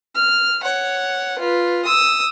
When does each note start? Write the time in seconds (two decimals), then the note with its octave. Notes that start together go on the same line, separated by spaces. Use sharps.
0.15 F6
0.61 C#5 F#5
1.39 F4 B4
1.85 D#6 E6